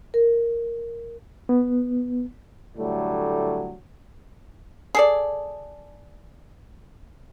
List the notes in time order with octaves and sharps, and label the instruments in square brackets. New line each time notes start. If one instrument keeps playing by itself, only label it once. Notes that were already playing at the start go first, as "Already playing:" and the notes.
[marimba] A#4
[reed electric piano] B3
[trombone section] A2 D3 F#3 G3 A3
[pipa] G#4 A4 D5